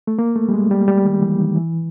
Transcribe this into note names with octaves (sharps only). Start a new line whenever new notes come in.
A3
A#3
A3
G3
G#3
G3
G3
D#3
E3
D#3
E3